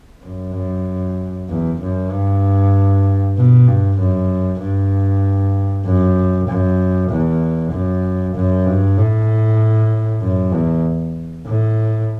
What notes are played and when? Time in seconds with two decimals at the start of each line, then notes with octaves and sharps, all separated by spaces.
0.25 F#2
1.49 E2
1.81 F#2
2.11 G2
3.37 B2
3.67 G2
3.99 F#2
4.61 G2
5.85 F#2
6.48 F#2
7.10 E2
7.72 F#2
8.35 F#2
8.66 G2
8.97 A2
10.21 F#2
10.53 E2
11.46 A2